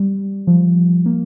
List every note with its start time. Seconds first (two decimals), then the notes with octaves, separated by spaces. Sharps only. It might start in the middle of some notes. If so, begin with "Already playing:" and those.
Already playing: G3
0.47 F3
1.06 A#3